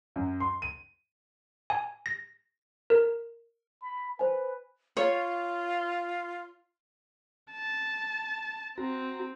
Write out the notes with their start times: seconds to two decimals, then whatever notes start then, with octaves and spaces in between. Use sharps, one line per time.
0.16 F#2
0.40 C6
0.62 D#7
1.70 G#5
2.06 A#6
2.90 A#4
3.82 B5
4.19 B4 C5 G#5
4.97 F4 C#5
7.52 A5
8.78 C4 F#4 A#5